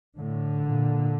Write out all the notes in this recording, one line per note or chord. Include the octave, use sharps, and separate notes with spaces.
A2 D3
A#2